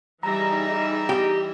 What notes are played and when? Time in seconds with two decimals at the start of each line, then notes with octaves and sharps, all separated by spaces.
0.23 E3 G3 D#4 G#4 D#5 E5 A#5 A#6
1.09 G4